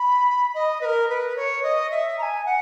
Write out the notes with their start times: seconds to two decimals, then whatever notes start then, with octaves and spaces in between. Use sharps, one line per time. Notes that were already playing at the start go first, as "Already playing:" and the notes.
Already playing: B5
0.54 D#5
0.81 B4
0.85 A#4
1.09 B4
1.36 C#5
1.63 D#5
1.91 E5
2.18 A#5
2.23 G#5
2.46 F#5